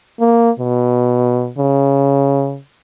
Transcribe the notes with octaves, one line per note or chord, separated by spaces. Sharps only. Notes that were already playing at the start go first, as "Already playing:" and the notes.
A#3
B2
C#3